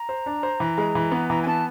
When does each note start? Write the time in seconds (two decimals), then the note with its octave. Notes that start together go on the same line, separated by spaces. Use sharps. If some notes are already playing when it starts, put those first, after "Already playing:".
Already playing: A#5
0.09 C5
0.26 D4
0.43 C5
0.60 E3
0.78 G#3
0.95 E3
1.11 B3
1.29 E3 A#5
1.42 G#5
1.46 B3 A5